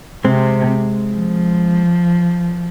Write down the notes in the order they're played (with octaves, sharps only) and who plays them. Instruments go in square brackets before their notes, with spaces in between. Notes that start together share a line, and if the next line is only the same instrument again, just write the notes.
[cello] C3 [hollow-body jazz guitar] G#3 C4
[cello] F3